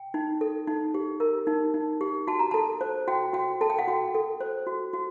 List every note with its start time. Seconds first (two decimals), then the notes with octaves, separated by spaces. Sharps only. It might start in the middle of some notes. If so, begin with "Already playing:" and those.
Already playing: G5
0.14 D#4
0.41 A4
0.67 D#4
0.94 G4
1.20 A#4
1.47 D#4
1.74 D#4
2.01 G4
2.27 F#4 A5
2.39 A#5
2.51 A4 A5
2.81 C5
3.08 F#4 G5
3.33 F#4 G5
3.61 A4 A5
3.70 G5
3.79 F#5
3.88 F#4 G5
4.15 A4
4.41 C5
4.67 F#4
4.93 F#4